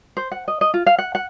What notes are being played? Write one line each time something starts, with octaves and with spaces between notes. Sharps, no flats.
C5
F#5
D#5
D#5
F4
F5
F#5
F#5